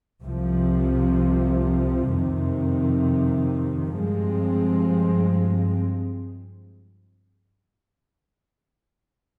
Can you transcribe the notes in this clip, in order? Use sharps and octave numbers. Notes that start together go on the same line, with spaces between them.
C2 C3 F3
F2 C3 D#3
G2 F3 G#3 C4